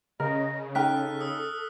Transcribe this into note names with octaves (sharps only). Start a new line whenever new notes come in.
C#3 A#4 D#5
D#4 A4 G5 A#5 F6 F#6 B6
D#6 E6